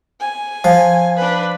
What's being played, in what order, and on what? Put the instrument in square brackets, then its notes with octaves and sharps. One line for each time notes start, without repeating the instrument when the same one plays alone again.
[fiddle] G#5
[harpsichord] F3
[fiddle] D4 B4